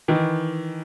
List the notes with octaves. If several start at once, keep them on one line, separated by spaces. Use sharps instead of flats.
D#3 E3